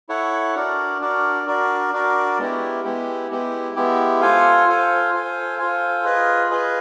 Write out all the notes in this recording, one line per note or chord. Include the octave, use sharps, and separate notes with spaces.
E4 A4 C#5 F#5
D4 F#4 A#4 D5
D4 F#4 A#4 D5
D4 F#4 A#4 D5
D4 F#4 A#4 D5
G#3 B3 E4 G4
G#3 B3 E4 G4
G#3 B3 E4 G4
G#3 B3 E4 G4
F4 A4 C5 F5 G#5
F4 A4 C5 F5 G#5
F4 A4 C5 F5 G#5
F4 A4 C5 F5 G#5
F4 G#4 B4 D#5
F4 G#4 B4 D#5